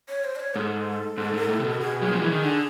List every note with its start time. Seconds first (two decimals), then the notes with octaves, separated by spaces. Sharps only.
0.09 C#5
0.24 C5
0.36 D5
0.40 C#5
0.56 G#2 A4
1.18 G#2
1.34 G#2
1.49 A2
1.60 C3
1.65 B2
1.80 B2 G#4
2.02 F#3
2.12 F3
2.22 E3
2.32 D#3
2.42 D3